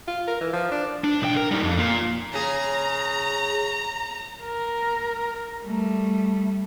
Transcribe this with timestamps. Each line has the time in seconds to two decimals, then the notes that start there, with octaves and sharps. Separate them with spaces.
0.08 F4
0.27 A#4
0.41 E3
0.53 F3
0.71 D4
1.04 D4
1.22 B1 G5
1.37 A#4
1.51 G3 D#4
1.63 F2
1.78 A#3 F4
2.33 C#3 G#4 A#5
4.43 A#4
5.63 G3 A3